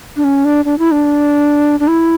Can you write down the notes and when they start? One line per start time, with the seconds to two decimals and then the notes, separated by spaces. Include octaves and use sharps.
0.16 D4
0.24 C#4
0.45 D4
0.65 D4
0.79 E4
0.91 D4
1.80 D4
1.88 E4